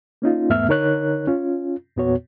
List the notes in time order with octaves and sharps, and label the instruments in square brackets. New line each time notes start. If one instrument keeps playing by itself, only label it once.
[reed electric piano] A#3 C#4 D#4 F4
E2 G#2 A3 B3 E5 F6
D3 D#4 A#4 C#5 F#6
C#4 F4
E2 A#2 B3 F#4 C#5